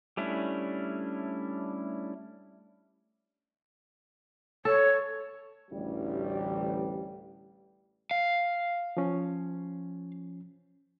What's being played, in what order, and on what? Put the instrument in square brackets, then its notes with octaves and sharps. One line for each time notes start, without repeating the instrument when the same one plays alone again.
[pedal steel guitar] G3 A3 C#4 D4 E4
[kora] A4 [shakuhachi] C#5
[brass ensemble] A1 D2 G3
[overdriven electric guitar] F5
[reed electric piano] F3 C#4